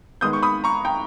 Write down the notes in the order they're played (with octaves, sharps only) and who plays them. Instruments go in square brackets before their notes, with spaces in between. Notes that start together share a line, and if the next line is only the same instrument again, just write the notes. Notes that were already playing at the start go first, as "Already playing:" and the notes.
[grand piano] D#3 G#3 B3 D#6 G6
C#6
B5 D#6
A#5 C#6
G5 A#5